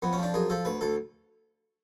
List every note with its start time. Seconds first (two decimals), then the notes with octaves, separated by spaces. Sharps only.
0.02 F2 B3
0.13 C#4
0.18 F3
0.23 D4
0.34 F#2 G#4
0.50 F3 A4
0.65 D2 B4
0.81 D2 A4